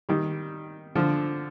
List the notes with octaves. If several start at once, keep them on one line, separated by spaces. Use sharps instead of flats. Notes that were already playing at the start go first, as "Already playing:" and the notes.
D#3 G3
D3 F3